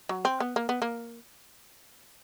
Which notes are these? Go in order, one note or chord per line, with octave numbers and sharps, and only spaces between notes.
F#3
C4
B3
A#3
B3
A#3